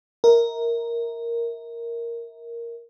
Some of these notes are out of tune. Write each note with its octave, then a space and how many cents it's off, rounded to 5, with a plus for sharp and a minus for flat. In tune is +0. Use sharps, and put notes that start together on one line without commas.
A#4 +0 E5 -30